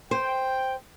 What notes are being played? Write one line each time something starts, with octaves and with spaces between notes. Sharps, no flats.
C5 G5